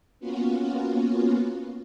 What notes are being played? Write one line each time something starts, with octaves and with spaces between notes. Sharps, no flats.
A#3 B3 C#4 F4 F#4